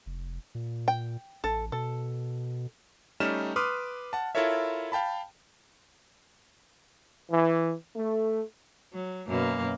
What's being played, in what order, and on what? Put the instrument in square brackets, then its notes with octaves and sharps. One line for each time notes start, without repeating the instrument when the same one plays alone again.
[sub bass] F1
A#2
[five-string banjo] G5
[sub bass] A1 [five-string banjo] A4
[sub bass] B2 [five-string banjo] A4
[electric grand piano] G3 A3 C#4 D#4 F6 E7
B4 C6 D6 D#6 F6
F#5 A5
E4 F4 A4 A#4 C#5 E5
F5 G5 A5 B5
[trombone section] E3
A3
[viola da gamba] F#3
F#2 B2 A#3